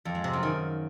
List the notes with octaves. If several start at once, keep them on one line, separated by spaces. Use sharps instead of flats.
F2
G#3
C3
F#2
D#3